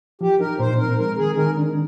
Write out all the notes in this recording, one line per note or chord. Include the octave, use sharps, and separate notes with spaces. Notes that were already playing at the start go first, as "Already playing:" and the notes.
F3 G4
D#4 A#4
A#2 C5
C4 A#4
G#3 A#4
D#3 G#4
D#3 A#4
D4